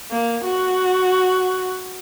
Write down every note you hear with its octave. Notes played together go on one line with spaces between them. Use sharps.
A#3
F#4